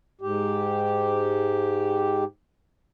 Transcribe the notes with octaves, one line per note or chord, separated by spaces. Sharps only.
G#2 G4